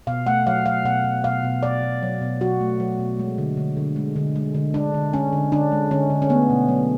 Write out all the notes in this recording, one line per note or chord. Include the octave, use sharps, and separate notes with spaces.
B2 F5
A3 F#5
F#3 F5
F#3 F5
B2 F#5
B2
B2 F5
B2
B2 D5
B2
F#3
B2
F#3 F#4
A3
F#3
B2
G#3
D3
D3
D3
G#3
D3
G#3
D3
G#3 D4
D3
G#3 C#4
D3
D3 D4
G#3
D3 C#4
D3
C#4
A3 B3
B2
F#3